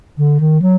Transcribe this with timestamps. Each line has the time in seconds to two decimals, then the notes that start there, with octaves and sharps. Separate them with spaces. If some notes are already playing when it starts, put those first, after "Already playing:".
0.18 D3
0.40 D#3
0.62 F#3